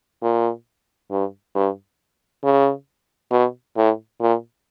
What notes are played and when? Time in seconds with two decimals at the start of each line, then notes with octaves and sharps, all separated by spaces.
0.22 A#2
1.11 G2
1.55 G2
2.44 C#3
3.31 B2
3.76 A2
4.20 A#2